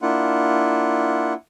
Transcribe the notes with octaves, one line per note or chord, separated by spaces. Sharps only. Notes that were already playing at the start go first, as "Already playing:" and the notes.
A#3 D4 E4 F4 F#5